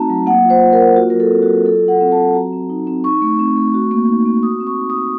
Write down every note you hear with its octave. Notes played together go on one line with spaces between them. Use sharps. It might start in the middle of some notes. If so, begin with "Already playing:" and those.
Already playing: A3 C4 D#4 F#4 A5 A#5
F#3
A#3 F#5
F4
C5
F4
A#4
A#3
F4 F#4
F#3 A#4
A4
C4
F#4
F#3
F4 A4
F#3
F#5
C4
A5
F#3
F#4 A#5
C4
D#4
C4
D#4 C#6
A3
C4
A3
F#4
A#3
D#4
A#3
F#4 D#6
C4
C#6
D#4
D#6
C4